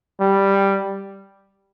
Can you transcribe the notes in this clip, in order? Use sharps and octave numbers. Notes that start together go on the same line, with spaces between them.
G3